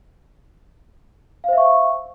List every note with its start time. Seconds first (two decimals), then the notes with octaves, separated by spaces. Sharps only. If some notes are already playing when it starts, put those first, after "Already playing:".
1.44 F5
1.48 C5
1.53 E5
1.58 C#6